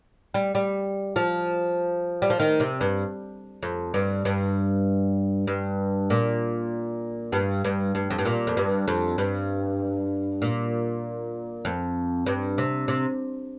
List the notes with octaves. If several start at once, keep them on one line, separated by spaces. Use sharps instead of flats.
G3
G3
F3
G3
F3
D#3
C3
G2
F2
G2
G2
G2
A#2
G2
G2
G2
F2
G2
A#2
F2
G2
F2
G2
A#2
F2
G2
C3
C3